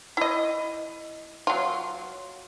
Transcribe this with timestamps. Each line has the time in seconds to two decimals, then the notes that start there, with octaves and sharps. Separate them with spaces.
0.17 E4 D#5
1.47 F#3 F4